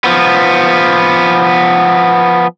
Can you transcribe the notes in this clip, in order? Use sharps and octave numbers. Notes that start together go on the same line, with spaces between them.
F3 B3